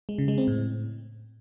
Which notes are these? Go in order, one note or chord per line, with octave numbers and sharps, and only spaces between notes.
G#3
C#3
G#3
C4
A2